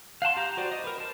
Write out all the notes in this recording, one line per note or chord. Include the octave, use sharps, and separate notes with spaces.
F5 F#5 A5 C6
G4 A#5
F#4 C5 D5
D#5
A#4 B4
C5 A5